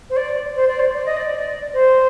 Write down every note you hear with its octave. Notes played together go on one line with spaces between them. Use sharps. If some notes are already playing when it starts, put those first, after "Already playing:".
C5
D5
C5
D5
C5
D5
D#5
D5
D5
C5